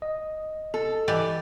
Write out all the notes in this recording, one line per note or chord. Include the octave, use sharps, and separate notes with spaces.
D#5
A4
E3 G4 D5 D#5